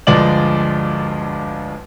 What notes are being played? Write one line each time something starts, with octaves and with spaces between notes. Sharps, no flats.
G1 D2 F3 G#3 D5 F#7